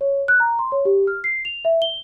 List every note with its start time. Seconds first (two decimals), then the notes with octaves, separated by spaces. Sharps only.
0.01 C#5
0.28 F#6
0.40 A#5
0.59 C6
0.72 C#5
0.85 G4
1.07 F6
1.24 C7
1.45 F7
1.65 E5
1.82 G7